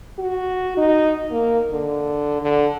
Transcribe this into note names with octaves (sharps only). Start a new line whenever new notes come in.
F#4
D#4
A#3
D3
D3